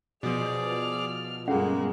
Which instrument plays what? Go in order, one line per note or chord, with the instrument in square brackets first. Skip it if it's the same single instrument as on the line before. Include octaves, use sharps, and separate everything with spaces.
[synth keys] B2 F3 [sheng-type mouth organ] G#4 D5 D6 [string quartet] F6
[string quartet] G2 C#3 G#3 [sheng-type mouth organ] A#3 [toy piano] C#4 A4 F#5